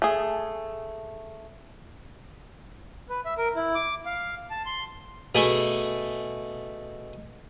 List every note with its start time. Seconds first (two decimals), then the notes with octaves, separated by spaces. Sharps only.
0.02 A3 G#4
3.09 B4
3.25 E5
3.38 A#4
3.55 E4
3.75 D6
4.05 F5
4.50 A5
4.66 C6
5.35 B2 A3 G#4